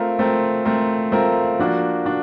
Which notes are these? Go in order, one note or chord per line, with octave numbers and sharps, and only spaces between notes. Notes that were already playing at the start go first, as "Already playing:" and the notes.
Already playing: A3 C4 F4 A#4
A3 C4 F4 A#4
A3 C4 F4 A#4
A3 C4 F4 A#4
F3 A#3 D4 F#4
D4 F#4